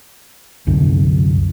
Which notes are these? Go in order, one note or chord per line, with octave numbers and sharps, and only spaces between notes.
C2 F#2 D3